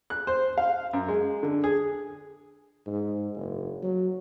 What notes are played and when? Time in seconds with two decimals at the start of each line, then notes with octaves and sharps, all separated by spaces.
0.10 F#6
0.27 C5
0.58 F5
0.93 F#2
1.08 G#3
1.43 D3
1.64 G#4
2.87 G#2
3.36 F#1
3.83 F#3